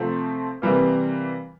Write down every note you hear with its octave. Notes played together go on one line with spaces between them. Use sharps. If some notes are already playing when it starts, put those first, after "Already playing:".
Already playing: C3 F3 A3 C4
C3 E3 G3 A#3